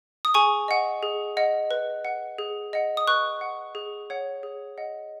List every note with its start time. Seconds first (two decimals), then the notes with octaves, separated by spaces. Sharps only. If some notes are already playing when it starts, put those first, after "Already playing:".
0.25 D#6
0.34 G#4 G#5 C#6
0.68 D#5 F#5
1.03 G#4
1.37 D#5 F#5
1.71 B4
2.05 F#5
2.38 G#4
2.73 D#5 F#5
2.97 D#6
3.07 B4 C#6 F#6
3.41 F#5
3.75 G#4
4.10 C#5 F#5
4.43 G#4
4.78 D#5 F#5